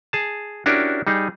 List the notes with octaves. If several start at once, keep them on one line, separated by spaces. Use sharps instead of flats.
G#4 A5
C#4 D4 E4 F#4 G4 A#4
G3 D#4 G#4